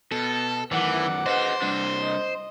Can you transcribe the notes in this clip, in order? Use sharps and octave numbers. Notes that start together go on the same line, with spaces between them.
B2 A4
F#2 D#3 E3 F#5 D6
G#4 B4 C5 D#5
C3 G3 D4
D#5